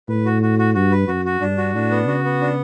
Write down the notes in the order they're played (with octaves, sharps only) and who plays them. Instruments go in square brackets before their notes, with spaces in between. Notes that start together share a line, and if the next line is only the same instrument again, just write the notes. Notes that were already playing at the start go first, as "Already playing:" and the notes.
[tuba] A2 [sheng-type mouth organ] B4
[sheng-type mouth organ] F#4
F#4
F#4
[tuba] G2 [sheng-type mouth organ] F#4
[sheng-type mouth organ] B4
[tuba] F#2 [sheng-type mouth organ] F#4
[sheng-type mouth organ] F#4
[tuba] G2 [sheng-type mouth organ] D4
[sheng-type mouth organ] F#4
[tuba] A2 [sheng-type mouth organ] D4
[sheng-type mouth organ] B3
[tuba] C#3 [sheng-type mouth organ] F#4
[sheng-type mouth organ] B3
D4